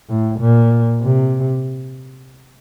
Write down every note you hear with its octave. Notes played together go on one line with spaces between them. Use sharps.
A2
A#2
C3